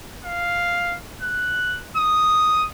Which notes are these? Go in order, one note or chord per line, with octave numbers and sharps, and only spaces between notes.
F5
F#6
D#6